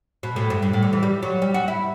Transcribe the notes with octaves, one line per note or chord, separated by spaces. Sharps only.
B2
A2
G2
G2
A2
D3
E3
G3
F#3
G3
F#4
E4